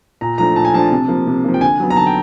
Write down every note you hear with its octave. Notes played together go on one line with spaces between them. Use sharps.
A#2 A#5
F3 A3 D4 A#5
A#2 A5
G#5
F3 A3 D4 A5
C3
F3 A#3
C3
F3 A#3
G5
D3 G#5
F#3 B3
A#5
D3 A5
G5